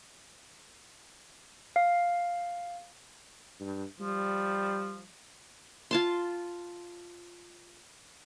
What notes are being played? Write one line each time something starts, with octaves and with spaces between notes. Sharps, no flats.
F5
G2
F3 G3
F4 A5 C6